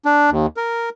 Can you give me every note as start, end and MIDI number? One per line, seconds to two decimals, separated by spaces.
0.05 0.30 62
0.30 0.46 39
0.57 0.89 70